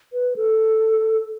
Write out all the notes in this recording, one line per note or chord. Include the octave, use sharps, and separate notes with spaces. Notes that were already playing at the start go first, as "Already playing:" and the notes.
B4
A4